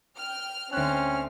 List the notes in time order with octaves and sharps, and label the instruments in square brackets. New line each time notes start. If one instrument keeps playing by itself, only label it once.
[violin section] G5 F6
[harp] D2 F#6 [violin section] C4 F6 [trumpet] C#4